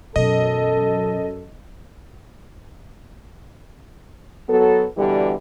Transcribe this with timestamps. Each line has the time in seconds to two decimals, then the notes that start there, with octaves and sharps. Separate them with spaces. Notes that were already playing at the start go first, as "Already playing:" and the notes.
0.16 F#2 B2 E3 A4 D#5
4.49 F#3 B3 A4
4.97 B2 D3 E3 G3